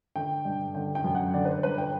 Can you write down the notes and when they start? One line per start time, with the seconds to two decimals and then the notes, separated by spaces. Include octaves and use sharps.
0.16 D3 G5
0.45 G2
0.75 D3 G5
0.95 G5
1.04 F#2
1.15 F#5
1.34 D3 D5
1.45 B4
1.49 C5
1.63 G2 B4
1.78 G5